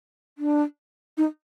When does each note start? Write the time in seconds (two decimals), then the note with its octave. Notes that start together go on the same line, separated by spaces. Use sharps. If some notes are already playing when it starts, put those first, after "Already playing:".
0.38 D4
1.17 D#4